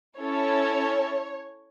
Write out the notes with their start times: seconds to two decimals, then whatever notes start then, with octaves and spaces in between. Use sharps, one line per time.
0.18 C#4 E4 A4 C#5